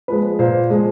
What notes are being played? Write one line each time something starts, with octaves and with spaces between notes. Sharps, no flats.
F3 G#3 B4
A#2 C5
F3 G#3